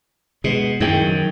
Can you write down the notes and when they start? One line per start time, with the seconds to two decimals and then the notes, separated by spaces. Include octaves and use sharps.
0.44 B2 G#3 G#4
0.80 F#2 D#3 E4 G#4 G5
1.01 C#3 F#3